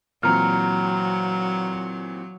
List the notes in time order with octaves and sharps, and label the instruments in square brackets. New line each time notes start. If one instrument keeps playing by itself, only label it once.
[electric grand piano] A#2 E3 C4 [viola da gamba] F#3 [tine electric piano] A#5 F6